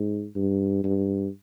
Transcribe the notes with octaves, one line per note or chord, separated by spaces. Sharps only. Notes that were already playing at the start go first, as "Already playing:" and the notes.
Already playing: G#2
G2
G2